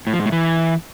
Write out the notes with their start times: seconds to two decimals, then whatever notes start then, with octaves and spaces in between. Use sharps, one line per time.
0.07 A2
0.13 F3
0.19 G#2
0.26 A2
0.32 E3